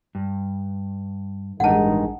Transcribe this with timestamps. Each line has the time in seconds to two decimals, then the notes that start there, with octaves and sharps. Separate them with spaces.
0.15 G2
1.60 A1 G2 D#3 G#3 D#4 F#5 A5